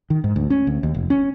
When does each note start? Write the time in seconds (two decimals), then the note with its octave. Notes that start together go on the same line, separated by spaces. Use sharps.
0.10 D#3
0.24 G#2
0.36 D2
0.50 C#4
0.67 D2
0.83 D#2
0.94 F1
1.10 C#4